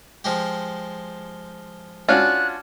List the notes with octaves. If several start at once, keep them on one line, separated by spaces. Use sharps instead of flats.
F3 G#3 G4
C#4 D4 F4 F#4 F#6